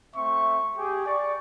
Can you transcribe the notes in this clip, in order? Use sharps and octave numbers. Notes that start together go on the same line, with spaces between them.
A3 C4 E5 C#6
G4 G#4
D5 C#6